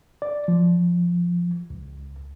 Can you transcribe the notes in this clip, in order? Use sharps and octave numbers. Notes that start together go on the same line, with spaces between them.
D5
F3
C#2